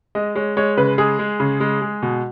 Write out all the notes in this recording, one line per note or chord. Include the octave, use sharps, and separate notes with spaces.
G#3 D#5
G#3 C#5
G#3 C#5
C#3 B4
G#3 G#4
G#3
C#3
G#3
G#3
B2